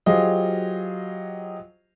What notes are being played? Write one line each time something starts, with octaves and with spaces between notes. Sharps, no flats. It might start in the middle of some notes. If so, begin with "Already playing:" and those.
F#3 F4 G4 G#4 C5 D#5